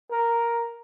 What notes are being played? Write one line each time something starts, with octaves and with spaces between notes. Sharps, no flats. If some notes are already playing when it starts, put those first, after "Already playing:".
A#4